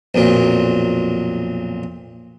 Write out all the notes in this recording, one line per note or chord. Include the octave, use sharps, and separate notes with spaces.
B1 F2 A#2 F#3